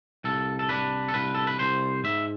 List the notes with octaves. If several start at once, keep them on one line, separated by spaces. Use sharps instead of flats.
C2 A4
A4
D4 B4
A4
C2 B4
A4
B4
C2 C5
G#2 E5